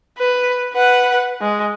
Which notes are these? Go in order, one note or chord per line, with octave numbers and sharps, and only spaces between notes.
B4
B4 F#5
G#3